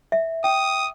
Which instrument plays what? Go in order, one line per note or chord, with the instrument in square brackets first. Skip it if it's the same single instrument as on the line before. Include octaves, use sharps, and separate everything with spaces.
[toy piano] E5
[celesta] G5 [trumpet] D#6